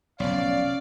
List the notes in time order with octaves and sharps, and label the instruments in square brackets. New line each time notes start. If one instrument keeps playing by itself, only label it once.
[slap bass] F1 B1 [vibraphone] C#4 C#5 [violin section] D5 [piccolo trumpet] F5